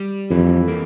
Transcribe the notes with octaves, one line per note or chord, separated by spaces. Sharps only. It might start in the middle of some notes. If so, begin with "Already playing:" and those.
Already playing: G3
F2 E3
A#3